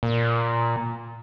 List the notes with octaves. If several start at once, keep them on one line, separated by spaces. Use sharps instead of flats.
A#2